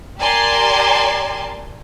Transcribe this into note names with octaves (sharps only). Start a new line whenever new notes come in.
G4 A#4 D5 G#5 A5 C6